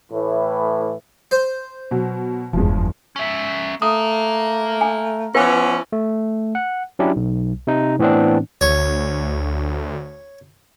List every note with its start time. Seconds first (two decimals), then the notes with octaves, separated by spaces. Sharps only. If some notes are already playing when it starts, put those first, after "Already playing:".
0.11 A2 E3
1.31 C5
1.91 B2 F#3
2.53 F1 E2 G2 F3 G#3
3.16 C#4 E5
3.82 A3 F5 A#5 D#6
4.81 G#5
5.35 E3 F3 B3 C#4 B4
5.92 A3
6.55 F#5
6.99 F#3 C#4 D4 E4 G4
7.16 B1
7.67 C3 D#4
7.99 A2 E3 B3 C4 D4
8.61 D2 C#5